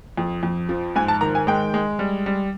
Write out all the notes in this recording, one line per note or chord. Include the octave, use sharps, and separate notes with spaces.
F2
F2
F3
G#2 G#5
A5
D#3 A#5
G#5
G#3 G5
G#3
G3
G3